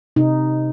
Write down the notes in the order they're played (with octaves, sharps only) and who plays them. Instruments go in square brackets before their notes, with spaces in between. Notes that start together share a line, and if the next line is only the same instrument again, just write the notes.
[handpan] C3 D#4